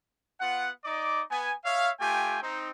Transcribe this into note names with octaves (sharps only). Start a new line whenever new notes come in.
B3 F4 F#5
D#4 D5 D#5 D6
B3 G#5
C#5 E5 F5
A3 F4 G4 G5 G#5
C4 D#4